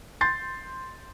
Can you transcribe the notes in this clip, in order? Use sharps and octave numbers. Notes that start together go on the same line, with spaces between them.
C6 G6 A6 C7